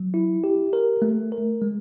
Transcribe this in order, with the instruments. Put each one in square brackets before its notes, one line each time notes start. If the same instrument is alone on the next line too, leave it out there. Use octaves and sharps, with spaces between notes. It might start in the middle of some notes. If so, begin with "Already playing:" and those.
Already playing: [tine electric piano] F#3
E4
G4
A#4
A3
A#4
G#3